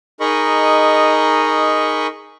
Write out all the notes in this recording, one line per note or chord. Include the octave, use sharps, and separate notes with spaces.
D#4 G#4 A#4 D#5 B5 C#6